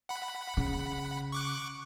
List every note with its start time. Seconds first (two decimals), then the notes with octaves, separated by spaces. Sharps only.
0.09 F#5 B5
0.57 C#3
1.32 C#6 D6 F#6